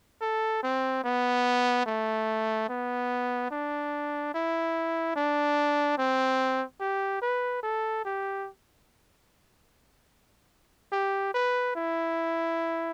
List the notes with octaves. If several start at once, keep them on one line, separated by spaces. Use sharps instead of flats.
A4
C4
B3
A3
B3
D4
E4
D4
C4
G4
B4
A4
G4
G4
B4
E4